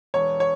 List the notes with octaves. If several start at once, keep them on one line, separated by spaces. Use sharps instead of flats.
E1 C#5
C#5